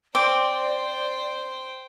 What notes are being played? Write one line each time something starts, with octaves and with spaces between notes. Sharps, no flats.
C4 C5 D5 G5 D6